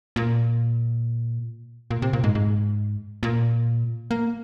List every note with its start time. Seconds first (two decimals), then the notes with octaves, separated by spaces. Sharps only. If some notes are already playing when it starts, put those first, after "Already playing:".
0.16 A#2
1.91 A#2
2.02 C3
2.13 A#2
2.24 G#2
2.35 G#2
3.23 A#2
4.11 A#3